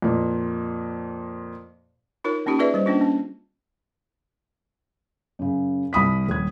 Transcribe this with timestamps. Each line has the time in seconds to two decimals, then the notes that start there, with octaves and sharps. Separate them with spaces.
0.02 F2 A#2
2.24 D#4 F4 A#4 C#5
2.46 A#3 C#4 D#4 F4 G4
2.59 F4 G#4 B4 D5 E5
2.74 G3 C5
2.86 A#3 C#4 D4 F4
3.01 C#4
5.39 F#2 C#3
5.93 C2 B5 D#6 B6
6.28 D#1 G#6